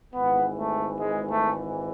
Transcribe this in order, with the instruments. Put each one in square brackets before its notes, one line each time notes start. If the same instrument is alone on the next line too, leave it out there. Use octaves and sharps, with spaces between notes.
[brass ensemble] G#1 G#2 E3 B3
A3
G#3
A3